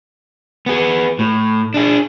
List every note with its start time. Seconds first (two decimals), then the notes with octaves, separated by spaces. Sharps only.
0.66 B3 G#4
1.19 A2
1.74 D4 G#4